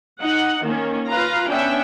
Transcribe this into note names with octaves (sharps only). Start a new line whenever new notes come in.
D#4 F#5
D#3 A#3 C#4
F4 B4 F5 A#5
B3 C#4 D4 E5 G5